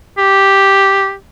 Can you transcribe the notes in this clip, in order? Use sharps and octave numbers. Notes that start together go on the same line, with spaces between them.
G4